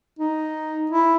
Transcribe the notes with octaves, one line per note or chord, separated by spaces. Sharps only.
D#4
E4